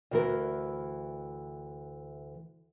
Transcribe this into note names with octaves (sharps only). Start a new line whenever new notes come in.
D2 E3 A#4